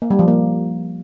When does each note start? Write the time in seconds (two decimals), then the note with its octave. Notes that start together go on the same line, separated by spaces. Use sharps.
0.02 A#3
0.10 G3
0.19 F3
0.28 A#3